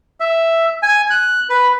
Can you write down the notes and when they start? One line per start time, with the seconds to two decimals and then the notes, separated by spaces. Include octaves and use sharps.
0.20 E5
0.83 G#5
1.10 F#6
1.50 B4